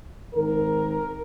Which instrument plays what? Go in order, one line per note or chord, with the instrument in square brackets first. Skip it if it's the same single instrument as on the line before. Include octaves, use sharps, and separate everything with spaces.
[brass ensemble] G#2 D#3 C4 A#4